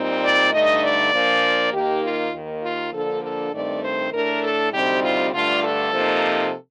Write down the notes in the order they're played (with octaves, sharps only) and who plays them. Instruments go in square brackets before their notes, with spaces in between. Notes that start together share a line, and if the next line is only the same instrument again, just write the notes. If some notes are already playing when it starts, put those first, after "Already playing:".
Already playing: [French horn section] A#2 G3 C4 D#4
D5
G2 D3 A3 D#4 D#5
D5
A#2 F3 A#3 D4
D#2 D#3 A#3 D#4 G4
F4
D#2 D#3 A#3
F4
D3 F3 A#3 D4 A4
A4
G2 D#3 A3 C4 D#4 D5
C5
A2 A3 D4 A#4
A4
D2 C3 G3 C4 D#4 G4
F4
G2 D3 A3 D4 F4
A4
C3 F3 A#3 D#4